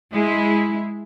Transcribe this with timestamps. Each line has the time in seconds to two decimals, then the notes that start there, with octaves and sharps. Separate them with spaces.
0.12 G#3 E4